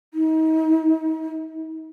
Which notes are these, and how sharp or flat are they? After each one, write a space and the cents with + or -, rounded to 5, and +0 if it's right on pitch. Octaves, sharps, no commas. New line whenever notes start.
D#4 +35